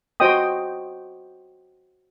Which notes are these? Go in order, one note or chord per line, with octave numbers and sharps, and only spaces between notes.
F#4 C5 D#5 G5 D#6